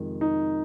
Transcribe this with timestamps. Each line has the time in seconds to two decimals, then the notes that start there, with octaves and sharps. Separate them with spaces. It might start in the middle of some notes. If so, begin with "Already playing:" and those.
Already playing: F2 C3 D#3 G#3
0.21 D#4